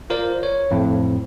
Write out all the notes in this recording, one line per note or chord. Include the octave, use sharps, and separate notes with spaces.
F4 A#4 C5 D5
C#5
F2 A2